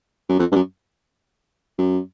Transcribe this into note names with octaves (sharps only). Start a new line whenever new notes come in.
F#2
F2
G2
F#2
F#2